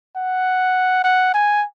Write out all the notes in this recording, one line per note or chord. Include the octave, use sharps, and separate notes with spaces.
F#5
F#5
G#5